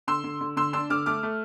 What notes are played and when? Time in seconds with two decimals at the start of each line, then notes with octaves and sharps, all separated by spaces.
0.08 D3 C6 E6
0.24 D3
0.41 D3
0.56 D3 C6 E6
0.73 D4 C6 E6
0.90 D3 D6 F6
1.06 A3 D6 F6
1.23 A3